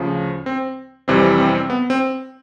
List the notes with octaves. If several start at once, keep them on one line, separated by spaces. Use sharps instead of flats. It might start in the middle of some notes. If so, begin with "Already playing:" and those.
Already playing: D2 C#3 F3
C4
F2 C3 E3 G3 C4
C4
C4
C4
B3
C4